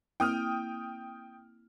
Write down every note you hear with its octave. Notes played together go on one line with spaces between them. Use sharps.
A#3 C4 E4 G5 D#6 F6